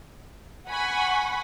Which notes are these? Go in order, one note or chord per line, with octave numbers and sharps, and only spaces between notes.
F#5 G#5 B5 C#6